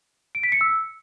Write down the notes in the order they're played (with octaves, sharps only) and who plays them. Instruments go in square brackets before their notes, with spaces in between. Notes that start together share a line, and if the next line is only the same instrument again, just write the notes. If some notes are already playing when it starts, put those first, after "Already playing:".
[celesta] D7
B6
C#7
E6